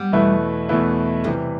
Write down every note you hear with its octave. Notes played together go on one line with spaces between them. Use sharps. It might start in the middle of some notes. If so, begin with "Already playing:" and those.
Already playing: G3 B3
E2 B2 A3 E4 B4
E2 B2 A3 E4 B4
C3 E3 F3 G3 A3